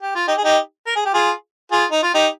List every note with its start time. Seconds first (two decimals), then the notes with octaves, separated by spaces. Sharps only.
0.02 G4
0.15 F4
0.28 D#4 G4
0.38 G#4
0.44 D#4 G4
0.87 A#4
0.96 G#4
1.05 G4
1.14 F4 G#4
1.72 F4 G#4
1.91 D#4
2.03 F4
2.14 D#4 G4